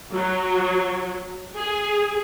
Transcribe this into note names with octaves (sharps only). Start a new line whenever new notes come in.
F#3
G#4